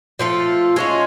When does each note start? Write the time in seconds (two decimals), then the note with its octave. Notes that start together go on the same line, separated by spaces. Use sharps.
0.19 F3 A3 F4 A4
0.76 G#3 C#4 F4